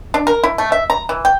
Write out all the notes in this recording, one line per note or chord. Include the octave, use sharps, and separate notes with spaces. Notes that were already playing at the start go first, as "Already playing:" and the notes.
D4
A#4
E4
A3
E5
A#5
E3
G5